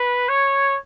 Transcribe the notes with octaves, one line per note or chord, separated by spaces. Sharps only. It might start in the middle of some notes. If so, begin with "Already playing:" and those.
Already playing: B4
C#5